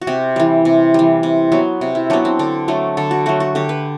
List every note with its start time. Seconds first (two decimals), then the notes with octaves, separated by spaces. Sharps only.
0.02 F#4
0.07 C3 G4
0.36 E3 G3
0.65 C3
0.94 E3 G3
1.23 C3
1.52 F#3 B3
1.81 C3
1.95 E4
2.10 F#3 B3 D4
2.25 C4
2.39 D3 D4
2.68 F#3 A3 D4
2.97 D3 A4
3.11 F#4
3.26 F#3 A3 F#4
3.40 F#4
3.55 D3 G4
3.69 B4